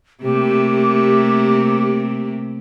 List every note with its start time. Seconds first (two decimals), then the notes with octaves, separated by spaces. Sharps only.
0.22 C3 A3 A#3 G4